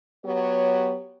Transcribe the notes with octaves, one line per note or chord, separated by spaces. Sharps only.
F#3 B3 G4 C#5